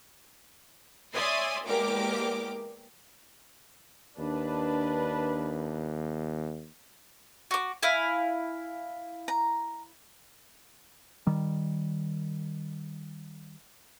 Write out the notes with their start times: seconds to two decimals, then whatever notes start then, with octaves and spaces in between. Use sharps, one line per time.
1.14 C#5 D5 E5 G#5 C6 D#6
1.66 E2 G#3 A#3 G4 A#4 D6
4.18 D#2 D4 B4
7.51 F#4 D6
7.83 E4 F5 G#5
9.28 A#5
11.27 D#3 G3